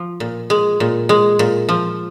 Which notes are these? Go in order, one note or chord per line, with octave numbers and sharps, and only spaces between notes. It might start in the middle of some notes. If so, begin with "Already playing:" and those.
Already playing: F3
A#2
G#3
A#2
G#3
A#2
F3